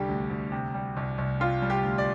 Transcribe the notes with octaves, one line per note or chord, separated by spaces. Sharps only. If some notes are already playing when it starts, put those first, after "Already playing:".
Already playing: C2 D3 G3 G4
D2
D2
C3
G3
C2
C2
C3 F4
G3
G4
D2
D5